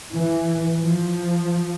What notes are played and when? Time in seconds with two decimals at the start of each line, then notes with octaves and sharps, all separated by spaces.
0.11 E3
0.81 F3